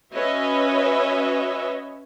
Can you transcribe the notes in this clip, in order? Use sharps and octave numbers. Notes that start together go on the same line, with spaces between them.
C#4 F#4 B4 C#5 D#5 E5